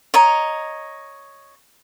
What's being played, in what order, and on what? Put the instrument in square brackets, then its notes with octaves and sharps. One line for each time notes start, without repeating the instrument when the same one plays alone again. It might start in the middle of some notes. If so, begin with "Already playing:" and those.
[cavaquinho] C#5 D#5 A#5